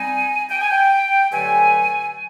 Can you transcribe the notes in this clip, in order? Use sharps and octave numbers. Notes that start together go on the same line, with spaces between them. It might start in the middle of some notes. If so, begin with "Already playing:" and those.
Already playing: G3 C4 D#4 G#5
G5
G#5
G5
G2 D3 F#3 A3 G#5